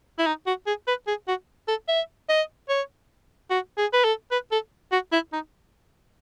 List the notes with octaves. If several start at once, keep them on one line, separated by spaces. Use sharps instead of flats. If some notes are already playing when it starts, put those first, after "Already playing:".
E4
D#4
F#4
G#4
B4
G#4
F#4
A4
E5
D#5
C#5
F#4
G#4
B4
A4
B4
A4
F#4
E4
D#4